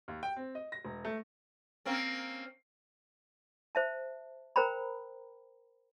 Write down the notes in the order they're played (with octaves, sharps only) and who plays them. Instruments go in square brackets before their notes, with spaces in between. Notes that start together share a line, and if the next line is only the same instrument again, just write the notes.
[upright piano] D#2
G5
C4
D#5
A#6
E1
A3
[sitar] A#3 C4 C#4
[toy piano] C5 E5 A5
A#4 C5 G5 A#5 B5